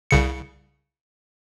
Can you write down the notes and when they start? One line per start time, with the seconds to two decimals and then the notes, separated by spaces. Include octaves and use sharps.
0.11 C2 C#3 C#7